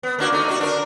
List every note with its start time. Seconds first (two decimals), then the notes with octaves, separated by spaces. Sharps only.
0.03 B3
0.19 A#3 D4 F#4
0.32 A3 D#4
0.48 D4 F#4
0.60 D4 A#4